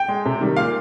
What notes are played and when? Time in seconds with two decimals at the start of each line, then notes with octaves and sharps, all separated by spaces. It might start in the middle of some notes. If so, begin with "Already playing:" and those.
Already playing: G5
0.08 G#3
0.25 C3
0.41 D#3 G3
0.56 A#2 F5